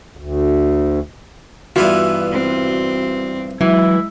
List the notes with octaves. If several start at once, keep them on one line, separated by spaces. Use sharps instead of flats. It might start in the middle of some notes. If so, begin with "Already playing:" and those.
D2
G2 E3 B3 F4 F#4
C4
E3 F#3 G#3 E4